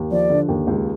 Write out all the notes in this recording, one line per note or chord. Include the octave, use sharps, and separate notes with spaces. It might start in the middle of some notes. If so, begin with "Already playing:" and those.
Already playing: D#2
F3 D5
D3
D#2
C#2